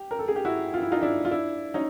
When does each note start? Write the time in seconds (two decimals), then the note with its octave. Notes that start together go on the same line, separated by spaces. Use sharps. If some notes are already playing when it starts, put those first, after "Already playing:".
Already playing: G4
0.11 A#4
0.19 A4
0.28 G#4
0.36 G4
0.45 E4 F#4
0.74 F4
0.82 E4
0.92 D#4 F4
1.02 D4 E4
1.25 F4
1.31 D4 E4
1.74 C#4 D#4